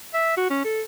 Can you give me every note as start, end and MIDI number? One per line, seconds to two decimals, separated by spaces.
0.14 0.36 76
0.37 0.49 66
0.50 0.61 61
0.65 0.82 69